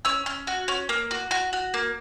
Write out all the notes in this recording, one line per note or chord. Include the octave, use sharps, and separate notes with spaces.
C#4 E6
C#4
F#4
C#4
A#3
F#4
F#4
F#4
A#3